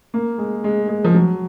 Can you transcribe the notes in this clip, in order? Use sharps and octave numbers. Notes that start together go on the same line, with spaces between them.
A#3
G#3
G#3
G#3
F3
F#3